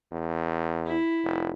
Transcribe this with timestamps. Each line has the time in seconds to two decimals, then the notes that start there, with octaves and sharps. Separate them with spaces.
0.12 E2
0.86 E4
1.24 F1